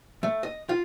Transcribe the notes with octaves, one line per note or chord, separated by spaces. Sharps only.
A3
D#5
F4